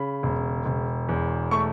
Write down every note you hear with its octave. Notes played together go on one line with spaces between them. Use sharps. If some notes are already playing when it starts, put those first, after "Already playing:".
Already playing: C#3 B5
E1
E1
E2
A3 C#6